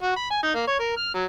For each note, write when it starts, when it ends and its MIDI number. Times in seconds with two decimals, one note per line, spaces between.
0.03 0.15 66
0.16 0.29 83
0.30 0.42 80
0.43 0.53 63
0.55 0.65 58
0.67 0.79 73
0.79 0.96 70
0.97 1.14 89
1.14 1.25 54